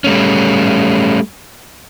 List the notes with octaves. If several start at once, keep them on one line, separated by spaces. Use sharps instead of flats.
G3 A3 C#4